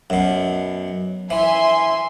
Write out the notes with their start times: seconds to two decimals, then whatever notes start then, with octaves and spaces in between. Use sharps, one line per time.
0.10 F#2 B2
1.30 E3 E5 G#5 C6